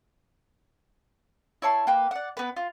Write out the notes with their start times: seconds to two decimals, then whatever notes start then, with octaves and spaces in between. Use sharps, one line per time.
1.62 E4 C#5 A5 C6
1.87 A#3 G4 B4
2.11 D5 F#5
2.37 B3 B4
2.57 F4